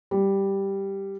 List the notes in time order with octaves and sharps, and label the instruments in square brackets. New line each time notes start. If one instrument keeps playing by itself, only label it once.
[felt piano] G3